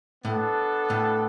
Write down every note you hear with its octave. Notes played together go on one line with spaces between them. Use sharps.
A2 B3 D4 A4
A2